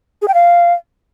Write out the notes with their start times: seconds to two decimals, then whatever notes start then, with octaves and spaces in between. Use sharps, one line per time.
0.22 G#4
0.28 G5
0.34 F5